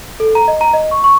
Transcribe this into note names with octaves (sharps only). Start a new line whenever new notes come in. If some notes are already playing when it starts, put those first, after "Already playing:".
A4
A#5
D#5
A#5
D#5
C#6
C#6